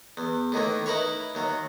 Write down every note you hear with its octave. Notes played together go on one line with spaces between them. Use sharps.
E2
A2 D#3 E3 A#3
D#4 E4 A#4 B4 C#5
D#2 F#3